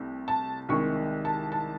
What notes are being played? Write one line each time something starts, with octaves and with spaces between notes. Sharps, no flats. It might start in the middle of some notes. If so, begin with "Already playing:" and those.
Already playing: C2 C3 A3
A5
C2 C3 D#3 G#3 C#6
A5
A5